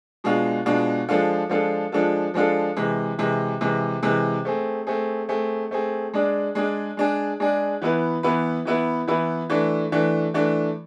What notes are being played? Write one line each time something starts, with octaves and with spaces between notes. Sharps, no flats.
B2 G#3 D4 F4
B2 G#3 D4 F4
F3 G#3 D4 F4 A4
F3 G#3 D4 F4 A4
F3 G#3 D4 F4 A4
F3 G#3 D4 F4 A4
C3 E3 G#3
C3 E3 G#3
C3 E3 G#3
C3 E3 G#3
A3 C4 G#4
A3 C4 G#4
A3 C4 G#4
A3 C4 G#4
G#3 D4 G#4 D5
G#3 D4 G#4 D5
G#3 D4 G#4 D5
G#3 D4 G#4 D5
E3 B3 E4 B4
E3 B3 E4 B4
E3 B3 E4 B4
E3 B3 E4 B4
E3 A3 D4
E3 A3 D4
E3 A3 D4